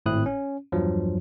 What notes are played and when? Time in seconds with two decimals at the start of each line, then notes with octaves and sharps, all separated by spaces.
0.06 G#1 A2 C4 E4 D#6 F#6
0.26 C#4
0.72 E2 G2 F3 F#3